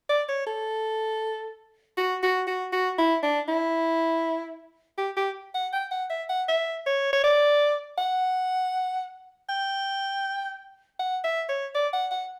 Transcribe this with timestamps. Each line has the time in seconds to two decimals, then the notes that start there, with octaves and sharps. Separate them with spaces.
0.10 D5
0.29 C#5
0.47 A4
1.98 F#4
2.23 F#4
2.48 F#4
2.73 F#4
2.99 E4
3.23 D4
3.49 E4
4.98 G4
5.17 G4
5.55 F#5
5.73 G5
5.92 F#5
6.10 E5
6.29 F#5
6.49 E5
6.87 C#5
7.13 C#5
7.24 D5
7.98 F#5
9.49 G5
11.00 F#5
11.24 E5
11.49 C#5
11.75 D5
11.93 F#5
12.12 F#5